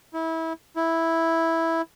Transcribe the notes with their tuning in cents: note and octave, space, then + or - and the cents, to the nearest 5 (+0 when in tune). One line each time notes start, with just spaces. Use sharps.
E4 -25
E4 -5